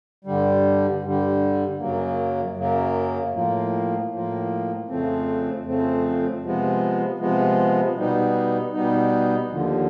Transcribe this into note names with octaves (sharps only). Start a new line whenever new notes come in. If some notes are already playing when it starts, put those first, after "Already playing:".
G2 D3 G3
G2 D3 G3
F#2 C#3 F#3 A#3
F#2 C#3 F#3 A#3
A2 F3 A#3
A2 F3 A#3
F2 C#3 F3 A3 C4
F2 C#3 F3 A3 C4
C3 F3 G#3 B3
C3 F3 G#3 B3
B2 G3 B3 D#4
B2 G3 B3 D#4
D#2 D3 F3